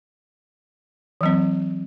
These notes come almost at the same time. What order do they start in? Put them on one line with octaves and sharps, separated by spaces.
E3 F#3 C4